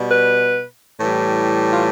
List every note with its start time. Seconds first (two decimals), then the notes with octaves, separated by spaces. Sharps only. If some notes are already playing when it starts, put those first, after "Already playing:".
Already playing: B2 G3
0.12 B4
0.98 A2 E3 G3
1.72 F4